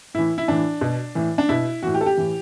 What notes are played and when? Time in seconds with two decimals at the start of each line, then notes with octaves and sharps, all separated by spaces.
0.14 A2 E3 E4
0.38 E4
0.48 A2 E3 D4
0.81 B2
1.15 A2 E3
1.38 D4
1.49 B2 E4
1.83 A2 E3 F#4
1.94 G4
2.01 A4
2.06 G4
2.17 A2 E3